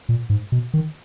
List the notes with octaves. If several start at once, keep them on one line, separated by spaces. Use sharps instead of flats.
A#2
G#2
B2
D#3